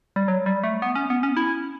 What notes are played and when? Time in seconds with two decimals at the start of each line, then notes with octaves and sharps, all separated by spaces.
0.16 G3
0.28 F#3
0.46 G3
0.64 A3
0.82 B3
0.95 C#4
1.10 B3
1.23 C#4
1.37 E4